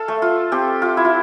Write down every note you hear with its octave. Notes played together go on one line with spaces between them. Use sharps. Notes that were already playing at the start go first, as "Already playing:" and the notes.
Already playing: A4 F5
A3
F4
C4 G4
F4
E4
F4